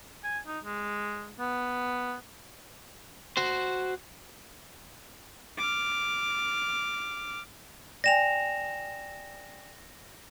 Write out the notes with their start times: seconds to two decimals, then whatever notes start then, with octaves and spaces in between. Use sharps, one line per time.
0.24 G#5
0.47 D#4
0.64 G#3
1.40 B3
3.37 F#4 C5
5.57 D6 F6
8.04 D5 G5 G#5 A#6 E7 F7